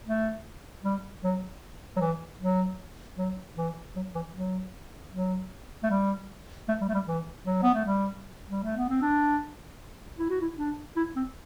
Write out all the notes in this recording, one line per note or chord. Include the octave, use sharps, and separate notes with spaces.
A3
G3
F#3
F#3
E3
F#3
F#3
E3
F#3
E3
F#3
F#3
A3
G3
A3
G3
A3
G3
E3
F#3
B3
A3
G3
G3
A3
B3
C4
D4
E4
F#4
E4
D4
E4
C4